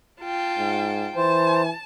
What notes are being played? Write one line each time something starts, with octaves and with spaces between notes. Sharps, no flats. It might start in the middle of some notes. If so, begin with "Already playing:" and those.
F4 G5 A5
G#2
E3 C5 A5